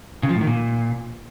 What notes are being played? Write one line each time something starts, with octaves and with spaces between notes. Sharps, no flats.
C#3
F3
A2
D#3
A#2